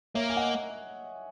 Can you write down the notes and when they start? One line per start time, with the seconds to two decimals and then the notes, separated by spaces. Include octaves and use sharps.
0.15 A#3 C#5 E5
0.30 G#5
0.36 D#5 F#5